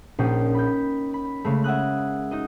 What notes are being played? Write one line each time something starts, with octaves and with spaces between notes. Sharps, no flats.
A#1 A#2 C#4 D#4 G5 C7
B5 G6
B5
C#3 G#3 A3
E5 F#5 G#5 D#6 F#6
D#4 F#4 D#5